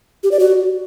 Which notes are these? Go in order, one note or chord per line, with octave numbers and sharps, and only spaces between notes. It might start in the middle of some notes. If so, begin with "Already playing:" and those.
G4
D5
F#4